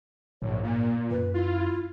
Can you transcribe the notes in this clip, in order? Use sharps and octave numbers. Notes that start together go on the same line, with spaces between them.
A#1 G#2 C#5
A#2 A#3
F#2 B4
E4 F4